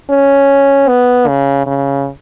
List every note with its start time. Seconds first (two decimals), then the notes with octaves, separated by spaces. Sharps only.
0.10 C#4
0.88 B3
1.27 C#3
1.67 C#3